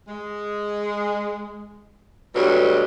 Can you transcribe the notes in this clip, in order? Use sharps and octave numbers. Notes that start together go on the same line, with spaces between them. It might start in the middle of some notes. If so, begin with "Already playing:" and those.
G#3
D2 G2 B2 F#3 G3